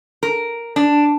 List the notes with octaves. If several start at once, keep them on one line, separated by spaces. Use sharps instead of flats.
A#4
D4